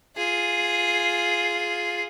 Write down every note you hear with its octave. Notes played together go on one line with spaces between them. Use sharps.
F4 G#4